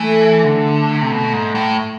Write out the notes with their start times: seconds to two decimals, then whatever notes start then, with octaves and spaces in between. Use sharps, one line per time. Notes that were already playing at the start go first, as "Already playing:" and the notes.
Already playing: E3 A3 A4
0.44 D3
1.02 C3
1.11 B2
1.33 G#2
1.55 A2